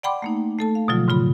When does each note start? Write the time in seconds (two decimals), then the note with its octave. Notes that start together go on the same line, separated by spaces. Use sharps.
0.03 D5 F#5 G5 B5 C6 D6
0.22 A3 A#3 D#4
0.59 A3 A4 A5
0.75 F5
0.88 B2 D3 F3 F#3 F4
1.08 G#2 C#3 F4 B5